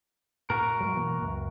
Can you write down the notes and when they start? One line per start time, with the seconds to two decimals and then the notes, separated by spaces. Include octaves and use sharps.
0.50 A2 F#4 A#4
0.81 G#2 F#3
0.94 B2 E3 A#3
1.21 C#2 F#2